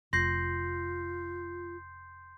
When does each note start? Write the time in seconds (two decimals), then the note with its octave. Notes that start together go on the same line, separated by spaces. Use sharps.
0.13 F1 F4 C6 G6 A#6 C7